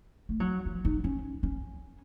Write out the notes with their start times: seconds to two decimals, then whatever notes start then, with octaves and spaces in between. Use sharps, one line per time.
0.29 A3
0.40 F#3
0.66 F3
0.85 D#4
1.04 C#4
1.43 C#4